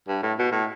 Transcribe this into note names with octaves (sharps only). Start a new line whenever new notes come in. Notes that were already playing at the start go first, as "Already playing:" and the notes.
G2
A2
B2
A2